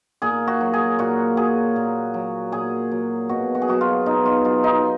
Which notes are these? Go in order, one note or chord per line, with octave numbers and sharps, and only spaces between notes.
A#2 G#4
F#4
F#3
G#4
A#2 F#4
F#3 G#4
A#2
F#3
A#2 G#4
F#3
B2 F#4
F#4
G#4
F#3 F#4
F4
B2 D#4
F4
F#3 F4
D#4